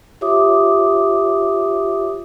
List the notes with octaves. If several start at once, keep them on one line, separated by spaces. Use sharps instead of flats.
F4 G4 C#5 E5 D6 D#6